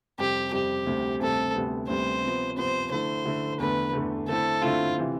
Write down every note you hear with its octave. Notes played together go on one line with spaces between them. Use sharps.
F2 C3 G3 C4 G4
F2 C3 G3 C4 G4
D2 C3 G3 C4
D2 C3 G3 C4 A4
D2 C3 G3 B3
D2 C3 G3 B3 C5
C3 F3 B3
C3 F3 B3 C5
D3 A3 E4 C5
D3 A3 E4
E2 D3 A3 B4
E2 D3 A3
D3 A3 C4 E4 A4
D3 A3 C4 E4 F4
C3 E3